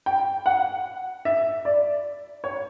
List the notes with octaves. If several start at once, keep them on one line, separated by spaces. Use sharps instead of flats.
G5
F#5
E5
D5
C#5